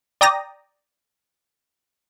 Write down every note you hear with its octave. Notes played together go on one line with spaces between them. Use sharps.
D5 G5 A#5 D#6 A#6